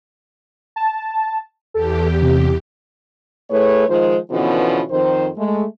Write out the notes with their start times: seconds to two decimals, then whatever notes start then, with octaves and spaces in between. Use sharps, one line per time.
0.76 A5
1.74 E2 G4 A4
2.22 C3
3.50 A2 A3 G#4 B4 C#5
3.88 D#3 F3 G#3 F4 C5
4.30 B2 D3 E3 F3 B3 C#4
4.90 F2 D#3 C5
5.37 G#3 A3